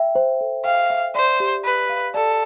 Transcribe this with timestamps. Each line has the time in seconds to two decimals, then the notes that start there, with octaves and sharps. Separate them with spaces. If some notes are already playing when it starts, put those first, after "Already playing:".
Already playing: E5 G5
0.15 C5
0.41 A4
0.65 F5 G5
0.90 E5
1.15 C5 D5
1.40 G4
1.65 B4 B5
1.89 F5
2.14 A4 D5